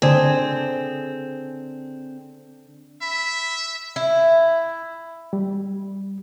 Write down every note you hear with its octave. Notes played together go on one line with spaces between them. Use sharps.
D3 C4 G#4
E5 B5
E4
G3